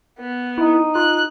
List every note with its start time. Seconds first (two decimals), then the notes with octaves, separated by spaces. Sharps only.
0.19 B3
0.58 D#4 E4
0.95 F4 F#6